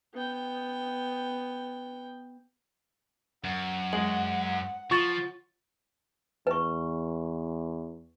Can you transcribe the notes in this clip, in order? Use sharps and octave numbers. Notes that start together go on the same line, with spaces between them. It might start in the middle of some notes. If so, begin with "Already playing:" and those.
B3 G5
F#2 F#5
G#3 F#7
F3 F4 C#6 A6
E2 B4 C#6